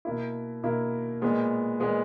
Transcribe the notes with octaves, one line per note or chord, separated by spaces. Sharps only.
B2 A#3 E4
B2 A#3 E4
A#2 G#3 B3
A#2 G#3 B3